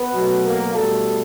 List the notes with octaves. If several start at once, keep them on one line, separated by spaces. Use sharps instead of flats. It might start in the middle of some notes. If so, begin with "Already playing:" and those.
Already playing: B3 B4
B2 F#3 A3
A#3 A#4
B2 G3 A3 A4